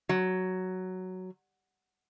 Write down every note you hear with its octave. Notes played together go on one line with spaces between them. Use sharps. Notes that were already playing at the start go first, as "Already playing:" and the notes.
F#3